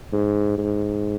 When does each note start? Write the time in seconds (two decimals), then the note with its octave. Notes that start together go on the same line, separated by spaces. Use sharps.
0.13 G#2
0.58 G#2